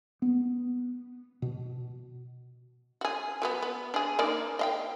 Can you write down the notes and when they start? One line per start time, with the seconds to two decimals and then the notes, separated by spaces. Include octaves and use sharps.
0.22 B3
1.42 B2
3.01 F#4 G#4
3.42 F#3 A3 B3
3.62 B3
3.94 D4 G#4
4.19 A#3 D#4 D5
4.59 D#5 F5 G5